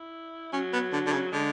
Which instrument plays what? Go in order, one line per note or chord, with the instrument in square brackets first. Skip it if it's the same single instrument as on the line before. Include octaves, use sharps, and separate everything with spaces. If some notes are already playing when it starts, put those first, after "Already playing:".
Already playing: [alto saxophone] E4
[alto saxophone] F#3 [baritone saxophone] C#4
[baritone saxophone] B3
D3
D3
C#3
[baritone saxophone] D3 [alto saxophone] G#3